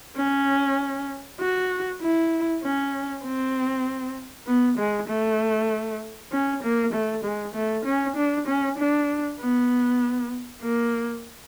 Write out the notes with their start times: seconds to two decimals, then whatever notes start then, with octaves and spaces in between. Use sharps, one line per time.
0.17 C#4
1.40 F#4
2.02 E4
2.63 C#4
3.24 C4
4.47 B3
4.78 G#3
5.08 A3
6.32 C#4
6.63 A#3
6.93 A3
7.24 G#3
7.54 A3
7.86 C#4
8.16 D4
8.47 C#4
8.78 D4
9.39 B3
10.62 A#3